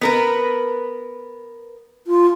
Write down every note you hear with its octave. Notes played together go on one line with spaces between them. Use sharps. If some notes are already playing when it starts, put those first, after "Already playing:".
B3 A#4 B4
F4